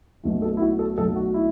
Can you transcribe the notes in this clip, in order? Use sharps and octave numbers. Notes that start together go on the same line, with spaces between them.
B1 B2 A3
A4
E4
F#4
A4
B1 B2 F#3 A3 A4
F#4
E4